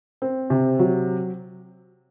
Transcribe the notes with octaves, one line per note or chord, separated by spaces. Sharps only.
C4
C3
F#3